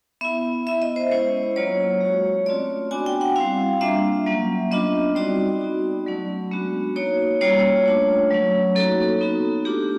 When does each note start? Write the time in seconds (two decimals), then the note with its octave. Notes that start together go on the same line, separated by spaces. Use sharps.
0.21 B3 E4 E5
0.67 B3 E4 E5
0.82 D#5
0.96 C5
1.11 G#3 C#4 E4 C5
1.56 F#3 A#3 C#4 F4 C#5
2.01 G#3 C#4 F#4
2.46 A3 C4 F4 D5
2.91 B3 D4 F#4 G#5
3.06 G5
3.21 F#5
3.36 G3 C4 E4 F5
3.81 G3 A#3 D4 F4 E5
4.26 F#3 A#3 C#4
4.71 B3 D4 F4 D#5
5.15 G3 C4 D#4 F#4 D5
5.61 B3 D#4 F#4
6.06 F#3 A3 C#4
6.51 G#3 B3 D4 F#4
6.95 A#3 D#4 F#4 C#5
7.41 G3 A#3 C#4 F4 C#5
7.86 A3 D4 F4
8.31 F#3 A3 C#4
8.76 A#3 D#4 F#4 A4
9.21 B3 D#4 F#4
9.65 A3 D4 F4 G4